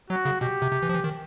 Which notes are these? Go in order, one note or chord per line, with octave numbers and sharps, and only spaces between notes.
F#3 F#4
C#3
B2 G4
C3
C3
E3
F3
E3
D#3